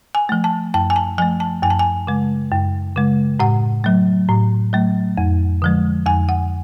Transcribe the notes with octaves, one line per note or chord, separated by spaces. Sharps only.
G#5
F3 A3
A5
F#2 A5
G#5
A5
F3 A3 G#5
A5
F#2 G#5
A5
G#5
C#3 G#3
F#2
C#3 G#3
A2 F#5
F#3 A3
A2
F#3 A3
F2
D3 F3 G#3
F2 G#5
F#5